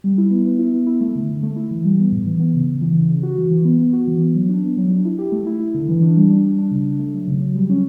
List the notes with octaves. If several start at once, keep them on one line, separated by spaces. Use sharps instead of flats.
G3
E4
B3
B3
E4
B3
E4
A3
D3
D3
A3
E4
E3
G3
B3
A2
E3
B3
C#3
C#3
E3
C#3
C#3
F#4
E3
E3
B3
B3
F#4
E3
B3
F#3
D4
B3
F#3
D4
E4
G4
A3
E4
E4
D3
E3
D4
G3
D4
G3
D4
C#3
D4
A3
F#3
C#3
F#3
G3
C#4